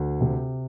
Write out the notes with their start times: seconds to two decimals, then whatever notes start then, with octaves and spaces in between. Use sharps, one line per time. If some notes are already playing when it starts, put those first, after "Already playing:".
Already playing: D2
0.21 C3